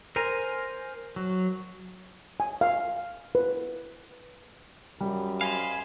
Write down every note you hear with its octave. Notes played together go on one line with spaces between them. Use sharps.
A#4 C5 G#5 A#5
F#3
G#5
F5
B4
F#2 G3
C5 D#5 F5 G#5 B5